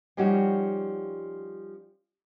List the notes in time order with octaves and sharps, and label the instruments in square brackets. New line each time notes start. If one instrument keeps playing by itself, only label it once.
[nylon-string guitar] F3 G3 C#4 D#4 F#4